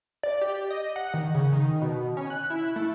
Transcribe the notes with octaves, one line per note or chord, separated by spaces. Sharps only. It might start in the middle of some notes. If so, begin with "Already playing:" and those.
D5
G4
D#5
F#5
D#3
C#3
D#3
B2
C#4
F#6
E4
A3